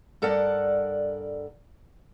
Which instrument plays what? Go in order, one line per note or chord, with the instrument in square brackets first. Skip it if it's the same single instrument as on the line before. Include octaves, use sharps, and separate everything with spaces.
[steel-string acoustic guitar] G2 A4 A#4 D5 F#5